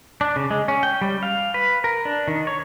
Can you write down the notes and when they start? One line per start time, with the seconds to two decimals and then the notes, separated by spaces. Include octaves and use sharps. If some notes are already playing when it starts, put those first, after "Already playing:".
0.21 D4
0.36 C#3
0.51 G#3
0.68 C#4
0.83 G5
1.01 G3
1.23 F5
1.54 B4
1.84 A#4
2.05 D4
2.28 D#3
2.47 C#5